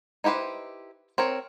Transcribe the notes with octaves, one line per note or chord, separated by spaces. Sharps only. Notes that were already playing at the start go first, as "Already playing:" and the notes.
D#4 E4 G4 B4 C5
C4 A#4 C#5